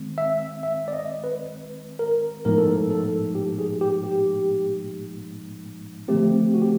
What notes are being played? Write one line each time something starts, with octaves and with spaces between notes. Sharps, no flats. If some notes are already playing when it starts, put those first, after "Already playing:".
Already playing: D#3 G#3 C4
E5
E5
D5
D#5
B4
A#4
A2 F3 G#3 B3 D#4 A#4
A4
A#4
A4
G4
G#4
G4
G4
D3 F3 A3 C4 G4
F#4
G4